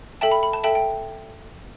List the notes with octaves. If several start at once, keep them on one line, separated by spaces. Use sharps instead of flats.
A4 E5 G5 A5
B5
B5
A5
A4 E5 G5 A5
G5